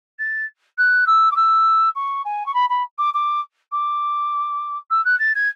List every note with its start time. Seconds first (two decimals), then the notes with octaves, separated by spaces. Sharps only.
0.19 A6
0.78 F#6
1.06 E6
1.31 D6
1.36 E6
1.95 C#6
2.25 G#5
2.46 C#6
2.54 B5
2.69 B5
2.98 D6
3.14 D6
3.72 D6
4.90 E6
5.05 F#6
5.19 A6
5.35 G#6